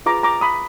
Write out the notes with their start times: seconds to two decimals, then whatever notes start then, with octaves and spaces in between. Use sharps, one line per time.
0.06 F4 G#4 B4 A#5 D6
0.23 A#5 D6
0.41 B5 D#6